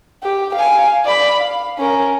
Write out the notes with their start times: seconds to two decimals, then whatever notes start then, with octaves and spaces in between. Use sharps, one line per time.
0.23 G4
0.55 F5 G#5
1.05 D5 B5
1.41 F5
1.79 C#4 A#4